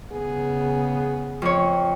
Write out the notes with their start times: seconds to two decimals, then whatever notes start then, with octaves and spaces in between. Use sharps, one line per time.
0.12 C#3 B3 G#4
1.42 F2 C#5